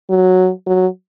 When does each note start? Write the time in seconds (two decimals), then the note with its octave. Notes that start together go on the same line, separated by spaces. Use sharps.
0.10 F#3
0.66 F#3